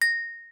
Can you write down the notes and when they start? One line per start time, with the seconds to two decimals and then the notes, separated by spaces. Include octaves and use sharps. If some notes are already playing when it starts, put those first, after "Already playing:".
0.02 A#6